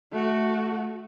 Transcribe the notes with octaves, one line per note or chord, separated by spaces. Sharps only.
A3 F#4